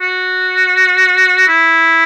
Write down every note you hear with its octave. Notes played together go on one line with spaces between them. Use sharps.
F#4
E4